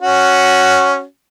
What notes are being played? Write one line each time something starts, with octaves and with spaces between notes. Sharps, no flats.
C#4 F#4